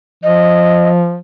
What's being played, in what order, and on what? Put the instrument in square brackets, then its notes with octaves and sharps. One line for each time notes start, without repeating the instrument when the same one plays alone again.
[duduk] F3 [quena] D#5